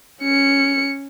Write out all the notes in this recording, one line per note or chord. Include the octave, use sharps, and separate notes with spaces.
C#4 C#7